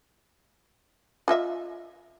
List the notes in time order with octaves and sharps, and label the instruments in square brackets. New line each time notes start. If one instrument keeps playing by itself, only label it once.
[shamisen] F4 D#5 E5